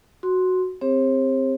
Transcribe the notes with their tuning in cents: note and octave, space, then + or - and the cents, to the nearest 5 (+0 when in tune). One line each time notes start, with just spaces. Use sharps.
F#4 +0 C6 +0
C4 +0 G4 +40 C5 +45